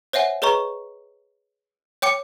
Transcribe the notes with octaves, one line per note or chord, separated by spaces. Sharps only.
C5 C#5 E5 F#5 G#5
G#4 B4 C#5 D#5 A#5 C#6
C#5 G5 D6 C#7